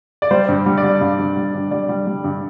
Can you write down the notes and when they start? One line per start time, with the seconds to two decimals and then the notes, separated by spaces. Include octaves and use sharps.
0.22 D5
0.31 G3 C5
0.48 G2
0.66 G3
0.78 D5
0.83 G3
1.01 G2 F5
1.19 G2
1.37 G3
1.54 G2
1.71 G3 D5
1.89 G3
2.06 G3
2.24 G2